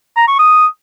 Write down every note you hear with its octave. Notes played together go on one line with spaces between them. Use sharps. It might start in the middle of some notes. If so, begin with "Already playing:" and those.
A#5
C#6
D#6